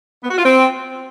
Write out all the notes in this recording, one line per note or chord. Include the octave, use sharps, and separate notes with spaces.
B3
F#4
F4
C4